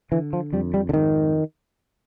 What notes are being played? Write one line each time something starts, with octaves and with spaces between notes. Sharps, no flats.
D3 E3
F3
F2 G3
G3
D3
G#2 D#3